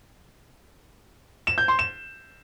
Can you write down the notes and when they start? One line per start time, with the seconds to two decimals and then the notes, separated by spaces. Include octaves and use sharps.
1.47 E7
1.58 G6
1.68 C6
1.79 E7